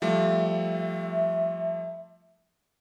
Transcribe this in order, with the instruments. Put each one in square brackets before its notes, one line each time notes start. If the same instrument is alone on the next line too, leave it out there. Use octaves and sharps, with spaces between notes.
[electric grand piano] F3 G3 A3 [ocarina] E5